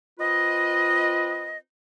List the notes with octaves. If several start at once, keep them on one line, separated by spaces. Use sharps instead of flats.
C4 F4 B4 D#5